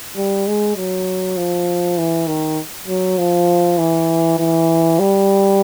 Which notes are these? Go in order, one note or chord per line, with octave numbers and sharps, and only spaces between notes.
G3
G#3
F#3
F3
E3
D#3
F#3
F3
E3
E3
G3